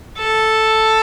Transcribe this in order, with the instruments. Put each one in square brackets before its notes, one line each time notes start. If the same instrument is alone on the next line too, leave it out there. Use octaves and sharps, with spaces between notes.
[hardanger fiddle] A4